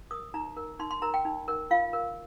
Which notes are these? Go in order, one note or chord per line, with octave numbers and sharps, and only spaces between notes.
A#4 D#6
D#4 A#5
A#4
D#4 C6
C6
A#4 A#5
G5
D#4
A#4
F4 F5
A#4